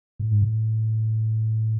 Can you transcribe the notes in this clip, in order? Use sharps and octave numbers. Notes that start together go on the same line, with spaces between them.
A2
G#2
A2